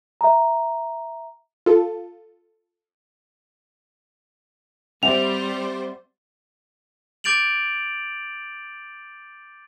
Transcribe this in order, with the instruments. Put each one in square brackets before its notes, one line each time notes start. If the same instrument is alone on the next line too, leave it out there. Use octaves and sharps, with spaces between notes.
[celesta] E5 A#5
[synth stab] F4 A4
[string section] G3 C5 [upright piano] C4 E5 F#5 [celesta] F7
[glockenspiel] D6 G6 A6 D7 F7 F#7